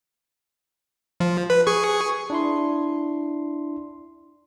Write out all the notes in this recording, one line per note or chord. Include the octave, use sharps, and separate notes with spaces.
F3
B4
G#4 C#6
D4 E4 C6